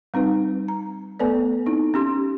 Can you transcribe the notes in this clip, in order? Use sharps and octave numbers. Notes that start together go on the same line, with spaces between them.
G3 C4 D#4 B4
A#5
A3 B3 A4 B4 D5
C4 D#4 E4
C#4 G4 C6